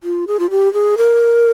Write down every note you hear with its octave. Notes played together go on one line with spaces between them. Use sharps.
F4
G#4
F4
G4
G#4
A#4